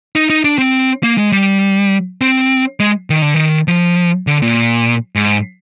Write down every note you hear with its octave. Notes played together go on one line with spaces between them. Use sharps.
D#4
D#4
D4
C4
A#3
G#3
G3
C4
G#3
D#3
D3
D#3
F3
D3
A#2
G#2